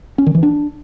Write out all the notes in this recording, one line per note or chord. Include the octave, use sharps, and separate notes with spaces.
C#4
D#3
E3
D4